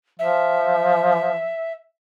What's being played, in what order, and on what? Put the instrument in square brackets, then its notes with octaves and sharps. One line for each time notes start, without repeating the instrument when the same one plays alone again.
[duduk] F3 [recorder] E5